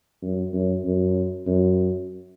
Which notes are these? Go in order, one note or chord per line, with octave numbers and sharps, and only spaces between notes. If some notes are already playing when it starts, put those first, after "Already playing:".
F#2
F#2
F#2
F#2